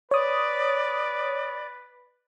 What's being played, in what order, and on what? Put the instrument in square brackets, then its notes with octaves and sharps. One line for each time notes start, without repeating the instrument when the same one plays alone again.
[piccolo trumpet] B4 [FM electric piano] C#5 D#6 [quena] D5